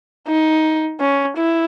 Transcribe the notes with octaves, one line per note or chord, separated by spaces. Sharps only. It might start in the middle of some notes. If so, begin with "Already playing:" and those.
D#4
C#4
E4